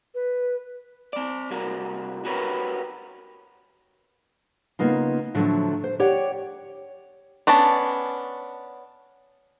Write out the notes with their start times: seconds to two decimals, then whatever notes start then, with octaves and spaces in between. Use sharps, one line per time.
0.15 B4
1.13 C4 D5
1.50 C3 G3 F#4 A#4
2.25 F#4 G4 A#4 B4 C#5
4.79 C#3 A#3 B3 D#4 F4
5.34 A2 D3 F3 F#3 A3
5.84 C5
5.99 G4 C#5 D5 F#5 G5
7.47 B3 C#4 D4 A5